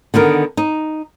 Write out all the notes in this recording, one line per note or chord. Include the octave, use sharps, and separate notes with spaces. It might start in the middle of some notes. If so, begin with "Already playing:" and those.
D3 D#3 B3 A#4
D#4